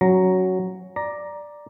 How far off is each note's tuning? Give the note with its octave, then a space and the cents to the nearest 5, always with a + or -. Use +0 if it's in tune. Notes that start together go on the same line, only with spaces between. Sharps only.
F#3 +5 C#4 +0 A#5 +0
D5 +5 A#5 +10